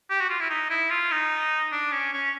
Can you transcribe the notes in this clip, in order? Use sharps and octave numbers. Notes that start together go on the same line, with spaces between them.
G4
F#4
F4
E4
D#4
E4
F4
D#4
D4
C#4
C#4